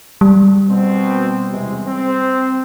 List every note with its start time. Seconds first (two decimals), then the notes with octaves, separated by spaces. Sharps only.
0.21 G3
0.69 B2 C4
1.52 E2 C3 G#3
1.86 C4